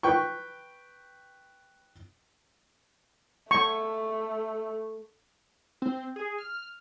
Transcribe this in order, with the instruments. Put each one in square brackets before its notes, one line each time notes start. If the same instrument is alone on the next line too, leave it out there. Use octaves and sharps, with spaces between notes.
[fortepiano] B4 G5 C#6
[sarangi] A3 [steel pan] C#6
[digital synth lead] C4
G#4
F6